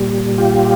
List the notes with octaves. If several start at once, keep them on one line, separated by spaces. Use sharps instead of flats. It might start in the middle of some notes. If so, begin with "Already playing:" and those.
Already playing: A#2 G3
F4 G4